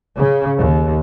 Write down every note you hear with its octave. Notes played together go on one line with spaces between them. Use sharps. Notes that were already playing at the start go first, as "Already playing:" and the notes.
C#3
D#2